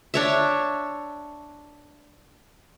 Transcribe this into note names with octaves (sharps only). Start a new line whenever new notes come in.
D4 C#5 E5